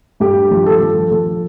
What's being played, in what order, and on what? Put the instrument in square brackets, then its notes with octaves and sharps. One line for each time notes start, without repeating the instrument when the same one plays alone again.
[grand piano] G2 G4
F3
A4
F3
F3 A4